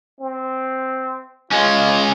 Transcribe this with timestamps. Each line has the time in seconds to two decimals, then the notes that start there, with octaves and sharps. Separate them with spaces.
0.21 C4
1.51 G#3 C#4 F4